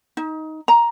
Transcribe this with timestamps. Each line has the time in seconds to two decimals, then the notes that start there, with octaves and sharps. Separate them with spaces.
0.17 D#4
0.68 A#5